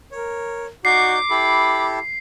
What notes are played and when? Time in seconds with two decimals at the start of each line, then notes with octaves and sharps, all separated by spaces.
0.12 A#4 C#5
0.85 D#4 F#4 D5 D6 G6 C7
1.30 E4 G4 A4 B5